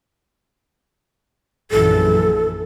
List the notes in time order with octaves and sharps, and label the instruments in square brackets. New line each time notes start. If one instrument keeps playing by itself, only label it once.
[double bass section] A#1 F#2 E3 [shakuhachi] A4